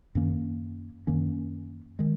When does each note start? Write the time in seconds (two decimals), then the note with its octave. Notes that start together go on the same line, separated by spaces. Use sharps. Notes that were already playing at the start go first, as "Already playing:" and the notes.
0.15 F#2 D#3 A#3 C#4
1.07 F#2 D#3 A#3 C#4
1.99 D#3 G#3